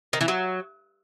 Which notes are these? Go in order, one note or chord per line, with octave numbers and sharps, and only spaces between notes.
D#3
E3
F#3